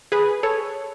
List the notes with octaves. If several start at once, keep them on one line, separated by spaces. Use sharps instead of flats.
G#4 B4
A4 C#5